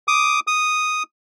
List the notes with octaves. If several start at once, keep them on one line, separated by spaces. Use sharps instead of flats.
D6 D#6
D#6